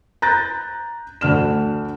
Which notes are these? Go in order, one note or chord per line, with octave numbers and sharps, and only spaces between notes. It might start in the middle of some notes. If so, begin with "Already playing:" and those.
A#5 F#6 G6 A6 A#6
D2 D4 F6 E7